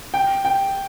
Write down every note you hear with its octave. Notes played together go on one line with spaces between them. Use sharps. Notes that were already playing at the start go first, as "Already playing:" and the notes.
G5
G5